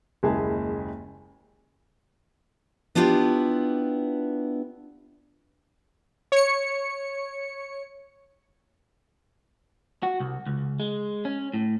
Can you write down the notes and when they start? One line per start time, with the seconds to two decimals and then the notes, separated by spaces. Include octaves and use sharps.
0.23 F#1 D#2 G#3 E4 G#4 A5
2.95 B3 D4 E4 F4 G4
6.32 C#5 C#7
10.03 F#4
10.20 C2
10.46 C#2
10.80 G#3
11.25 C#4
11.54 A2